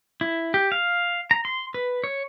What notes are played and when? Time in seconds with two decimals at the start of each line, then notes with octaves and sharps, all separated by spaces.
0.21 E4
0.54 G4
0.72 F5
1.31 A#5
1.45 C6
1.74 B4
2.04 C#5